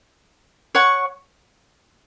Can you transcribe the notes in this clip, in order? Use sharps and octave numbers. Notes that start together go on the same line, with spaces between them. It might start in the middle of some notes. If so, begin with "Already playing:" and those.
C#5 F#5 C#6